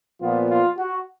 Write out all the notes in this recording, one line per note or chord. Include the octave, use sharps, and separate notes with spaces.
A#2 F3 B3 F4
F4
F#4